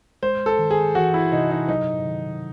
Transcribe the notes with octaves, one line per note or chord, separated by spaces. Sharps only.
G#3 C5
A4
D#3
G#4
E3 F#4
E4
C3 D#4
D#4
F#3 D#4
D#3